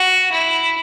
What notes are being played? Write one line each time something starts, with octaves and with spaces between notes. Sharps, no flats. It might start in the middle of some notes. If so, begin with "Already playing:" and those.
Already playing: F#4
E4